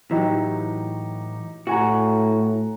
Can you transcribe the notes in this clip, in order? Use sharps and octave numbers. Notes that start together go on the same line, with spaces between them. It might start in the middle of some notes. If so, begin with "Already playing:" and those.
A2 E3 F#3 D#4 G4
A2 F#4 F#5 G#5 A#5